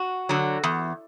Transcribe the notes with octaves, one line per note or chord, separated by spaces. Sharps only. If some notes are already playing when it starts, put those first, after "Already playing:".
Already playing: F#4
D3 F#3
E2